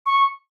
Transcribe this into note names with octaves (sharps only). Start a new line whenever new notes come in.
C#6